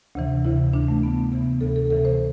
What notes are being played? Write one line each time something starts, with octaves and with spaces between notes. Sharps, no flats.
D2 C3 E3
D2 C3 E3 E4
D2 C3 E3 D4
A3
D2 C3 E3 B3
A3
D2 C3 E3 B3
B3
D2 C3 E3 A4
A4
D2 C3 E3 A4
C5